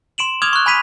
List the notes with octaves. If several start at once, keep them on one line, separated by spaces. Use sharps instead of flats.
C6 D7 E7 F#7
D6 D#6 F6 G#6 F7 G7
C#6 F#6
G#5 B5 G#6 B6 D#7 F7